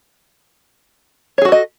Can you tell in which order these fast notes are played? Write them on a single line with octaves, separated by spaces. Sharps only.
C#5 G#4 F#4 A4 D#5